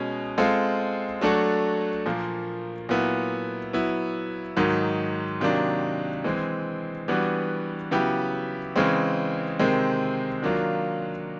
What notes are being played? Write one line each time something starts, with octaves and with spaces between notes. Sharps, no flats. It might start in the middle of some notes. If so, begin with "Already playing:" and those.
Already playing: B2 G#3 C#4
G#3 C4 F4 A4
F#3 A3 D4 F#4 A4
A#2 F3 A#3
A#2 F#3 B3 E4
F#3 B3 E4
G#2 D#3 F#3
C3 D#3 F#3 A#3 D4
E3 G#3 C4
E3 G3 B3 D4 F#4
C#3 F#3 B3 E4 G4
C#3 E3 G#3 C4
C3 D#3 G#3 C4
D#3 F#3 A#3 D4 F4